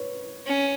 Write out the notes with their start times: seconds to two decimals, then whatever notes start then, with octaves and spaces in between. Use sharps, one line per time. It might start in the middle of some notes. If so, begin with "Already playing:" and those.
Already playing: B4 C#5
0.46 C#4